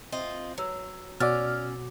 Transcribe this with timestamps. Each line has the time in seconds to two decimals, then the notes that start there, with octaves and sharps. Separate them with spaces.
0.12 C4 F4 D#5
0.58 F#3 B4 C#5 E6
1.20 B2 C#4 F#4 D5 D6 E6 F6 A6